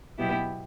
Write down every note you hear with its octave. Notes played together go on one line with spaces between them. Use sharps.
B2 F#3 B3 E4 G4